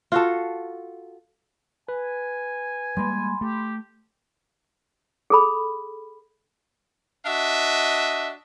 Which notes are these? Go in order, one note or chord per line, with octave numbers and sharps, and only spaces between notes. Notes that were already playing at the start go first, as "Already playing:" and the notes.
F4 F#4 A4
B4 G#5
G3 G#3 A#3 B5 C6
A3 G4
G#4 A4 B5
D4 F#4 D#5 E5